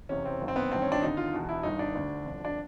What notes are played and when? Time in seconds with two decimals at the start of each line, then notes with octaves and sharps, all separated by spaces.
0.09 F#1 E2 C3 C#4
0.25 C4
0.40 F#1 F#2 D#3
0.48 C4
0.56 B3
0.71 A1 G2 D#3 C4
0.82 C#4
0.92 D4
1.02 D#2 D3 D#4
1.17 F4
1.33 E1 E2 B2
1.49 E4
1.63 G1 G2 D#3 D#4
1.79 D4
1.95 D2 D3
2.26 G1 F2 D3
2.45 D4